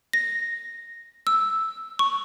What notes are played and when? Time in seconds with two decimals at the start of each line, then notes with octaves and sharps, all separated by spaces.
0.13 A#6
1.27 E6
1.99 C#6